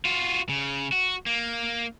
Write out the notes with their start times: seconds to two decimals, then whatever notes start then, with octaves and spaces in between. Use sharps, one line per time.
0.05 F4 F#4
0.49 C#3
0.92 F#4
1.26 A#3